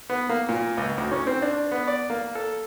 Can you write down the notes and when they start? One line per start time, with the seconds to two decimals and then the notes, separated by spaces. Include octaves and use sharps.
0.10 B3
0.29 A#3
0.49 A#2
0.77 C#2
0.98 D2
1.11 C#4
1.27 C4
1.42 D4
1.71 B3
1.88 D5
2.10 A#3
2.35 A4